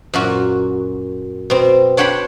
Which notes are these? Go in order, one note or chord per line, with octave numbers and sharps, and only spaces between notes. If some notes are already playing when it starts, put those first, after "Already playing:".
F#2 A#2 F#4
B2 C4
D4 C#5 F#5 G5 B5 C6